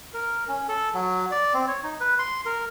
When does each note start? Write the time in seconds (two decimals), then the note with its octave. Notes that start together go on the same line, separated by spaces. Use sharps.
0.14 A#4
0.48 C#4
0.69 A4
0.94 F#3
1.31 D5
1.54 C4
1.68 C#5
1.83 D#4
2.00 B4
2.19 C6
2.46 A#4